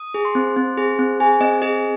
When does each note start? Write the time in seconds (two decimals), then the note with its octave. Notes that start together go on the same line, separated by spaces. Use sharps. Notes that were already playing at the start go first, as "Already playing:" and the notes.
Already playing: D#6
0.14 G#4
0.25 C6
0.35 C4
0.57 C4
0.78 G#4
0.99 C4
1.20 G#4 G#5
1.41 C4 D#5
1.62 G#4 D#5